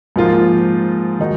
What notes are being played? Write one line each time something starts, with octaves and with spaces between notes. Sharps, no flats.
G#2 F3 A#3 F4
D#3 G#3 D#4 F#4